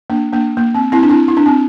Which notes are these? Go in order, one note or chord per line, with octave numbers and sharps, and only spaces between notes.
A#3 D4
A#3 D4
A#3
C4
C4 E4
D4
C4 E4
E4
D4
C4